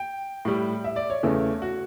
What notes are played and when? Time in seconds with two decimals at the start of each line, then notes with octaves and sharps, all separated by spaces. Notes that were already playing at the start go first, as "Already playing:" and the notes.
Already playing: G5
0.45 A2 G3
0.84 E5
0.96 D5
1.10 C#5
1.23 E2 C#3 E3 A3
1.62 F#4